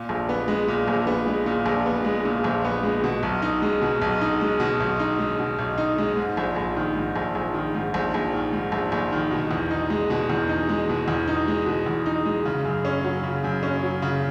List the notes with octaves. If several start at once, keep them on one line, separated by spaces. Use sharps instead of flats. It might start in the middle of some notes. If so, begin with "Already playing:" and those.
Already playing: A#2
A#1
B3
G#3
A#2
A#1
B3
G#3
A#2
A#1
B3
G#3
A#2
A#1
B3
G#3
B2
B1
D#4
G#3
B2
B1
D#4
G#3
B2
B1
D#4
G#3
B2
B1
D#4
G#3
G#2
A#1
A#1
D#3
G#2
A#1
A#1
D#3
G#2
A#1
A#1
D#3
G#2
A#1
A#1
D#3
B2
E2
D#4
G#3
B2
E2
D#4
G#3
B2
E2
D#4
G#3
B2
E2
D#4
G#3
C#3
F#2
C#4
F#3
C#3
F#2
C#4
F#3
C#3